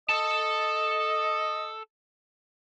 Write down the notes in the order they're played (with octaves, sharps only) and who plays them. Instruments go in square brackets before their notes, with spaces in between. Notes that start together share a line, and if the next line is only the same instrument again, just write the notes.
[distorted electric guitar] A4 A5 [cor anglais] D#5